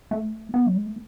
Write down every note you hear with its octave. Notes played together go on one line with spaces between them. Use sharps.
A3
B3
F#3
G#3
A3